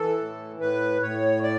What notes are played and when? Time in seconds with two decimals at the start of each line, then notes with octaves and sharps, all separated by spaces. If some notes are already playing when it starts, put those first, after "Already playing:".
Already playing: E3 A4
0.19 A2
0.60 A2 B4
1.02 A2 C#5
1.43 D5